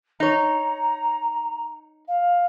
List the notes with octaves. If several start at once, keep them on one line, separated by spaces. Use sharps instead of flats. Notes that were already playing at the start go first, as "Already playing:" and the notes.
D#4 C#5 A#5
F5